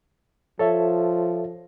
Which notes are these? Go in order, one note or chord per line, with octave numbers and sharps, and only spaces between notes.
F3 A4 C#5 E5